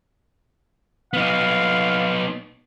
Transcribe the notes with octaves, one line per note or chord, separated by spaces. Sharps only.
B3 D#4 F5